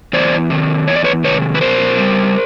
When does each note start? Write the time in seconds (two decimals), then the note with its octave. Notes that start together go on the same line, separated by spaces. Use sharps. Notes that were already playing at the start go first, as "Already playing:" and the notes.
0.13 E2 C5 D5
0.50 C3 D#3
0.88 E2 C#5
0.96 D5
1.04 B4 C#5
1.24 C3 D#3 B4 C#5
1.55 B4
1.61 B2 A#4 C5
1.98 G3